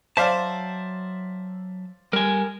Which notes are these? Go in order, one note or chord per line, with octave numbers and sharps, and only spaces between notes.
F#3 C5 D5 E5 F5 A5
G3 A#4 G#5